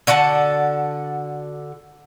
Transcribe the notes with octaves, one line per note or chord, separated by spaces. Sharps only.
D3 F#4 F#5 A5